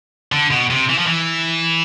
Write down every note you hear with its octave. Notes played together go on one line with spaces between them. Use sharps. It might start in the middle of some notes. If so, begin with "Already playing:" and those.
D3
B2
C3
E3
F3
E3